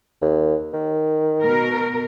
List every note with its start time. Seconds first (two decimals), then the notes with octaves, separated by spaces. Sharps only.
0.22 D#2
0.73 D#3
1.42 B2 A#4